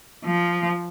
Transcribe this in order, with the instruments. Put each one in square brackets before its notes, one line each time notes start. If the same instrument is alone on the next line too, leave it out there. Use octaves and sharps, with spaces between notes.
[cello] F3